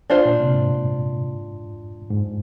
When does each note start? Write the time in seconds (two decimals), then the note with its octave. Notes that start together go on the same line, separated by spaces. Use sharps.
0.10 D4 F4 C5
0.25 A#2
0.40 C3
0.54 G#2
2.11 G#2